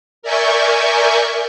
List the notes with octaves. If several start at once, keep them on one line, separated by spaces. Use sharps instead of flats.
A#4 D5 E5 G#5 C#6 G6